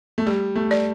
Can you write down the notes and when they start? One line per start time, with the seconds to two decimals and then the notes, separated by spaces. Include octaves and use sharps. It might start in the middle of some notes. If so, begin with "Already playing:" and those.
0.18 A3
0.26 G3 G4
0.55 A3
0.71 D5